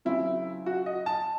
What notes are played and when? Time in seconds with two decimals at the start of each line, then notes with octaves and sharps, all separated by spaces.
0.05 C#3 F#3 C4 E4
0.66 F#4
0.86 D#5
1.06 A5